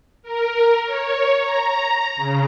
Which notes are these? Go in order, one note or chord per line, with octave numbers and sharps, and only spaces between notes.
A#4
C#5
A#5
C#3